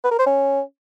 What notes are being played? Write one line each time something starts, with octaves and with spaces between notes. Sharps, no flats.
B4
A#4
C5
C#4